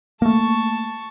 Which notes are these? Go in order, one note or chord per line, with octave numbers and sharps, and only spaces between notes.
A3 A#3 A5 C#6